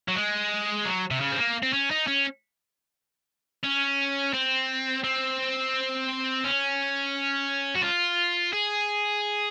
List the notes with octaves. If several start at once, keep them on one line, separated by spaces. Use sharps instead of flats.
F#3
G#3
F#3
C3
C#3
C4
A#3
C4
C#4
D#4
C#4
C#4
C4
C4
C#4
F#4
F4
G#4